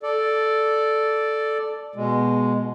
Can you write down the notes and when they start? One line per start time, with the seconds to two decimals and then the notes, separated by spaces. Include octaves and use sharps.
0.03 A4 D5
1.96 B2 G#3